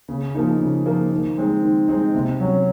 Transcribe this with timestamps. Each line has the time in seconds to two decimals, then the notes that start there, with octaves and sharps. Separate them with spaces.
0.09 C#3
0.34 F3 A#3 D#4
0.60 C#3
0.86 F3 A#3 D#4
1.11 D#3
1.37 G#3 C4 D#4
1.63 D#3
1.88 G#3 C4 D#4
2.14 C3
2.40 F#3 C#4